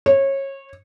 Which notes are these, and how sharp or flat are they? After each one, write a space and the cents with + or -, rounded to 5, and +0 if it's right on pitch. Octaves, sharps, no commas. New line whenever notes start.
C#5 -25